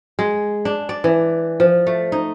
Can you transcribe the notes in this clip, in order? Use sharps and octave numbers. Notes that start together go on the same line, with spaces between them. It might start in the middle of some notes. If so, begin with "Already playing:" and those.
G#3
D4
D5
E3
F3
A3
D#4